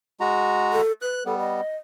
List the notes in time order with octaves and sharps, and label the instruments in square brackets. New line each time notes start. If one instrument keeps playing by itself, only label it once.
[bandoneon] G#3 F#4 A#5
[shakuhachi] A4
[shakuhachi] B4 [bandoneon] F#6
[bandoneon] G3 B3 [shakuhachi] A4
[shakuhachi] D#5